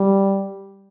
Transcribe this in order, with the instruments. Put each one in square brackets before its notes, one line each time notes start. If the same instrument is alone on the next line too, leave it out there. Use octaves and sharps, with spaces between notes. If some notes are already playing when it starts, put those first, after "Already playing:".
Already playing: [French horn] G3